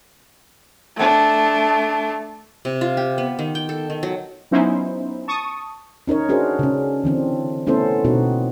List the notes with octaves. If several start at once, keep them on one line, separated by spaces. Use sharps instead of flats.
A3 D4
C3
F4
G4
B3
D#3
G5
A4
D#3
F#3
F#3 B3 C#4 D#4 E4 C5
A5 C#6 D#6
C#4 D#4 A#4 C#5
C#4 D4 F#4 G#4 A#4 C5
C#3 C#4
D3 E3 C4 D4
A3 B3 C#4 E4 A4 C5
B2 B3 C4 D#4 F#4